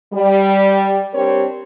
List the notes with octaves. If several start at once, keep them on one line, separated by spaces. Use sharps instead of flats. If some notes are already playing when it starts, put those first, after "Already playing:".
G3
G3 C4 D4 G4 A#4 C#5